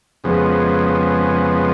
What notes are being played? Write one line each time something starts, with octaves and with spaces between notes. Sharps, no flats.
F2 C#3 F3 G#3 B3